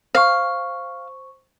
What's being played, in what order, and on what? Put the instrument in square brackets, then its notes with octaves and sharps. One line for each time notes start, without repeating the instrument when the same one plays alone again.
[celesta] C5 C#6 [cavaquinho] F5